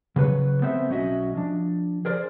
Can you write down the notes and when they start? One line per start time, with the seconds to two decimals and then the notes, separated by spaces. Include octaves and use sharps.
0.16 C#3 F#3 B4 C#5
0.62 B3 C4 A4 C5 E5
0.89 B1 F#3 C#4 F#4 D#5 E5
1.35 F3 D4
2.05 G#4 A#4 C5 D5